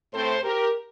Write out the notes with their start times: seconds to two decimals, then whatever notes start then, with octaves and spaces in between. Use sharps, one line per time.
0.13 A2 A3 C4 A4 C5
0.43 G4 A#4